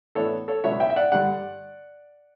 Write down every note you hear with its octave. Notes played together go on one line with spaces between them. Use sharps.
A2 E3 B3 D4 A4 C#5
A4 C#5
C#2 B2 F#3 B3 D4 C#5 E5
E5 G5
E5
D5 F#5
G2 D3 G3 D4 D5 F#5